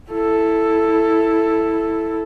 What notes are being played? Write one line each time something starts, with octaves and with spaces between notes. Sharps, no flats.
E4 A4